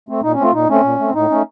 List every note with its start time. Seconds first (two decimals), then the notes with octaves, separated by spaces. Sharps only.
0.09 A3 C4
0.23 A#2 D#4
0.34 C#4
0.39 A3 C4 F4
0.53 A#2 D#4
0.69 A3 C4 C#4
0.84 A#2
0.99 A3 C4
1.14 A2 D#4
1.31 A3 C#4